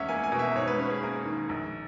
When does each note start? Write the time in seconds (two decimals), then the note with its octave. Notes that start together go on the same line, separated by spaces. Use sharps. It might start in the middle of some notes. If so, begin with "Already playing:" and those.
Already playing: E2 G#2 C#4 E5 F#5
0.09 A#3 G#5
0.24 G#5
0.32 B2
0.39 E5
0.55 G#2 C#5
0.68 B4
0.79 C#4 B4
0.91 G#4
1.03 A#3 A#4
1.25 D#3
1.49 A#1